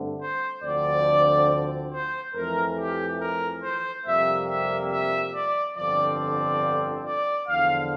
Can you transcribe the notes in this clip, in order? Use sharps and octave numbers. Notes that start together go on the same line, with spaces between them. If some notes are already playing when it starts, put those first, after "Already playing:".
Already playing: G2 D3 A3 C4
C5
D2 D3 F3 C4 D5
C5
F2 E3 A3 A#4
G4
A#4
C5
F2 C3 G3 A#3 E5
E5
E5
D5
G1 F2 D3 F3 C4 D5
D5
D5
E2 D3 F3 F5